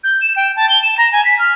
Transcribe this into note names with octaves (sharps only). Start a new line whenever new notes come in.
G6
E7
G5
A5
G7
E7
A#5
G#5
B6
F6